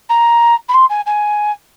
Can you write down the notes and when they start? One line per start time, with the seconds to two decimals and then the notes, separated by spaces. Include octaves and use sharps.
0.09 A#5
0.69 B5
0.74 C6
0.90 G#5
1.06 G#5